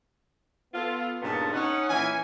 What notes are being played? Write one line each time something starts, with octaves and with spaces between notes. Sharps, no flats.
B3 F4 A4
G2 A#2 C#3 B3 D#4 A5
C#4 D#4 F#5
A#2 E3 C#4 G#5